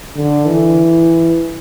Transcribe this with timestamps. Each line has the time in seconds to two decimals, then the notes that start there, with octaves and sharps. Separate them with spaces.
0.16 D3
0.46 E3